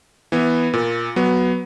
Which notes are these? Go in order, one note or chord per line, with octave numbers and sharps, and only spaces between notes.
E3 B3
A#2
F#3 B3